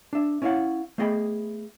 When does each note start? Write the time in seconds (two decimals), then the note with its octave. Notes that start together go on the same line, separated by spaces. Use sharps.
0.13 D4 E5
0.42 C#4 E4 C#5 D5 F5 F#5
0.98 A3 B3 G#4 D#5 G5 B5